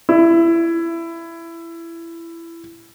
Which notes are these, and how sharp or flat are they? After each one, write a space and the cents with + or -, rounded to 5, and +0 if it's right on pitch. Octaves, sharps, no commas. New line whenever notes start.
E4 +20